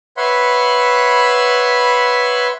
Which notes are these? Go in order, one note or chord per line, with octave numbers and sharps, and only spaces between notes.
B4 C#5 E5 F#5 B5 C6